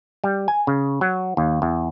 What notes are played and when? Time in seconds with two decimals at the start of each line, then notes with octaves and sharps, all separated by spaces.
0.24 G3
0.48 G#5
0.67 C#3
1.01 F#3
1.37 D#2
1.62 E2